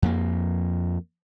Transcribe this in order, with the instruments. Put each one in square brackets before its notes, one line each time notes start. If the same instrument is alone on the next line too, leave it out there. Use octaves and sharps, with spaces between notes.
[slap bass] F2 A#3